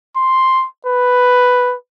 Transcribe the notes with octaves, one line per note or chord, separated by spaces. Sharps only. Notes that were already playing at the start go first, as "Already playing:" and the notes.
C6
B4